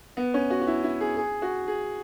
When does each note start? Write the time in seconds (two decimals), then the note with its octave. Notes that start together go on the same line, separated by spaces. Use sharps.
0.17 B3
0.34 C#4
0.50 F#4
0.61 F#4
0.67 E4
0.83 E4
1.00 G#4
1.17 G#4
1.42 F#4
1.67 G#4